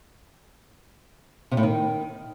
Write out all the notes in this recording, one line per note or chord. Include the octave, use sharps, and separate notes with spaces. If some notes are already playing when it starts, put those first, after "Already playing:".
C3
A2
D#3